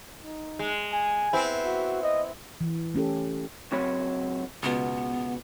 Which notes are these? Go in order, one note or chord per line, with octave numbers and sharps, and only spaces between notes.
D#4
G#3
G#5
B3 C4 E4
F#4
D#5
E3
A3 C#4 G4 A4
C#2 F#3 C4 F#4 C#5 B5
C#2 B2 B3